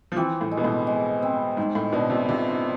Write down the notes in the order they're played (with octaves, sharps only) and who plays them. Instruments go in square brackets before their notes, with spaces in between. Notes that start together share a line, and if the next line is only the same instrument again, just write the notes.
[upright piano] F3
[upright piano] E3 [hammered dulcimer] C4
[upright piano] A2
[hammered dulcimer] G#3
[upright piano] B2
A2
[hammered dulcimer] G#3
C4
[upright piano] G#2 [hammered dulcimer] G#3
[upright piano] A2
[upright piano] B2 [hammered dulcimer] D3
[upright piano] C3
[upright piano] C3 [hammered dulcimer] F4